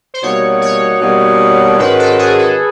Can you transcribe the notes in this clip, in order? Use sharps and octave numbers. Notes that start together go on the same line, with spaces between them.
C5
B2 G3 A#3 D#4 F#4 C#5
C#5
B2 G3 A#3 D#4 F#4
G#2 D#3 G#3 C#4 F#4 B4
A4
G#4
A4